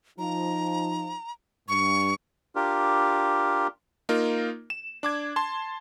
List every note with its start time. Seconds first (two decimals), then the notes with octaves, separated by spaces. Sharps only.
0.18 F3 D#4 A#5
1.68 G2 C#6
2.55 D4 F4 G4 A#4
4.09 A#3 D#4 F4 A#4
4.70 E7
5.03 D4 D6 G#6
5.36 A5 C6